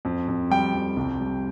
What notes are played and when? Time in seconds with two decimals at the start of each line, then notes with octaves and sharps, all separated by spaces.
0.05 F2
0.28 F2
0.50 G3 G5
0.74 F2
0.97 C2
1.19 G3